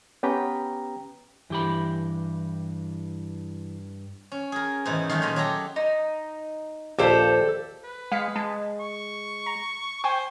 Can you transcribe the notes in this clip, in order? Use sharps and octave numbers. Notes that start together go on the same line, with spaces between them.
B3 C#4 G4 B4 G5 A#5
G2 E3 G4 B5
C#4
G#4 A#4
G#2 B2 D#3 E3
D#3 F#3 G#3 A3
A#2 F4 D#5
F#3 G4 A4 A#5
D#4
A#1 D#2 G4 A4 C5
B4
G#3 F5 B6 C#7
G#3 A5
C#6
A#5
C5 G5 G#5 C#6